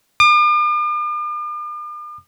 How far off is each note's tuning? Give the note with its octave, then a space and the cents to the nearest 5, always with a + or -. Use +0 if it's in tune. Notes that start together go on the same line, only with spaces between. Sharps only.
D6 +45